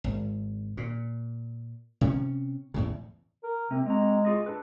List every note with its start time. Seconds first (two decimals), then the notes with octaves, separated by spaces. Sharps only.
0.04 G#1
0.77 A#2
2.01 C3 C#4
2.74 E2 A2 C#3
3.44 A#4
3.71 C3 C4
3.86 G#3 C4 F#4 A#5
4.25 F4 G#4 D#5
4.46 D4 A4 B4